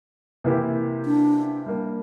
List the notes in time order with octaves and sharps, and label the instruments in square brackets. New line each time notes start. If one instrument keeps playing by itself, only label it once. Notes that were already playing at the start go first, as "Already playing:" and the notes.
[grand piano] C3 E3 A#3 E4 G4
[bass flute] D4
[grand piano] G3 A#3 D4